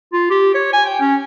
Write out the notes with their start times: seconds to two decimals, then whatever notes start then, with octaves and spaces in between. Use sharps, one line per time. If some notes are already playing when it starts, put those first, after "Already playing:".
0.13 F4
0.30 G4
0.55 C#5
0.73 G#5
0.85 G5
1.00 C#4